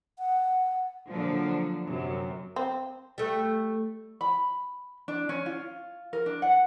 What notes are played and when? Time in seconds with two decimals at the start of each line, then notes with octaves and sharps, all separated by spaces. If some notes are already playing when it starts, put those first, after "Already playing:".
0.19 F#5
1.09 A#2 D3 F3 F#3
1.85 F#2 C3
2.56 C4
3.18 G3 A3
4.21 B5
5.08 D4
5.29 C#4
5.46 F4
6.13 A#4
6.26 D4
6.42 F#5